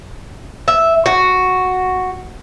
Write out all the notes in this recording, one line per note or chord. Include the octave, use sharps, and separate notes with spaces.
E5
F#4